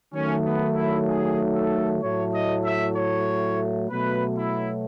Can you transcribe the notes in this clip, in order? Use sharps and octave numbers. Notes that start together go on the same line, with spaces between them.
D#3 F#3 A3 C#4
B3
E4
G#4
A4
A2 F#3 A3 C#5
D#5
E5
C#5
B2 F#3 A3 B4
E4